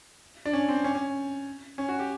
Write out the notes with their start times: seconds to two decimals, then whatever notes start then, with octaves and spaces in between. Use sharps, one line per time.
0.45 D4
0.53 C#4
0.69 C4
0.84 C#4
0.95 C#4
1.78 C#4
1.89 F#4
1.99 G4